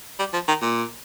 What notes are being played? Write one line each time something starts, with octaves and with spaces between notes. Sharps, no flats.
G3
F3
D#3
A#2